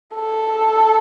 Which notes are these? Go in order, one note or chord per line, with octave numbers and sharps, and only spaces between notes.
A4